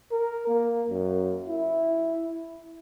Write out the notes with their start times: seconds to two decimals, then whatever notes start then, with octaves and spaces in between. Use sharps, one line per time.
0.12 A#4
0.48 A#3
0.90 F#2
1.48 E4